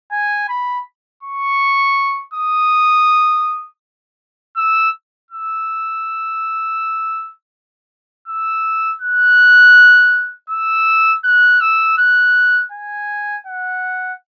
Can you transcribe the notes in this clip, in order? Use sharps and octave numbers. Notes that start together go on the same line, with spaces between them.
G#5
B5
C#6
D#6
E6
E6
E6
F#6
E6
F#6
E6
F#6
G#5
F#5